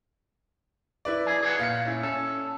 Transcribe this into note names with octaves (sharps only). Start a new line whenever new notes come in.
E4 B4 D5
F2 G#4
G#4 C#5 F#5
A#2 F5 C#7
C#4 E4
C#4 A4